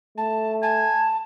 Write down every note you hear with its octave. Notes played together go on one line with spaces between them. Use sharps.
A3 A5
G#5 A5